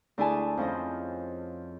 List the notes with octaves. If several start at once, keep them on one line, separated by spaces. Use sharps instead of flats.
D2 D4 E4 G#4 G#5 A5
F2 F3 C#4 D#5